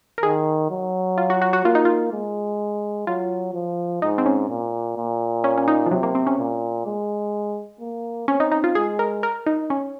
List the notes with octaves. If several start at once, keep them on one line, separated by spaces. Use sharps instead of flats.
A#4
D#3 G#4
F#3
F4
F#4
F#4
F#4
A#3 F4
D#4
F4
G#3
F#3 F4
F3
G#2 D#4
C4
C#4
A#2
A#2
C#4
C#4
D#4
F3
C3 F#3
A#3
C4
C#4
A#2
G#3
A#3
C4 C#4
D#4
D#4
F4
G#3 G#4
A#4
A#4
D#4
C#4